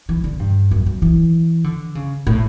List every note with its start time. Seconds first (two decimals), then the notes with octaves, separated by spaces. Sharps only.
0.09 E3
0.24 D3
0.39 G2
0.71 F#2
0.86 F#2
1.02 E3
1.64 D3
1.95 C#3
2.27 A2